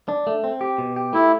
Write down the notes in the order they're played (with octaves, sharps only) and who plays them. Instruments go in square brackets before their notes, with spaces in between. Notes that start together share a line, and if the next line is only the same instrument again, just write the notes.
[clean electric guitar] D4
A3
C4
G4
B2
G4
[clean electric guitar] A3 [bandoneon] E4